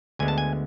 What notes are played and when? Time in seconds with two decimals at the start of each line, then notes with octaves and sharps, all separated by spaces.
0.19 D2 D3 G#3 B3 G#5
0.28 A5
0.38 G#5